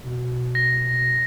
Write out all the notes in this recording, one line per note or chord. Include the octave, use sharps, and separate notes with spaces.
B2
A#6